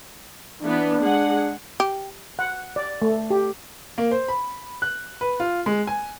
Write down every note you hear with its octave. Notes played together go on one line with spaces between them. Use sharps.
E3 B3 D4
G#3 G#4 F#5
G4
F#5
D5
A3
G4
A#3
C5
B5
F#6
B4
F4
G#3
G#5